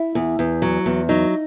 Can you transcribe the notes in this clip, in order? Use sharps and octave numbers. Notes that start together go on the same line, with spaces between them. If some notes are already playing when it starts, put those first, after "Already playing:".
Already playing: E4
E2
E2
F#3
E2
F#3 D#4